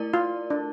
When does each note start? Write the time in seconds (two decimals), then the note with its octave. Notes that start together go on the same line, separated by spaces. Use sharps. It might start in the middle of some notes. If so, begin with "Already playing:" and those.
Already playing: A3 E4 A#4 D5
0.14 F4
0.50 D4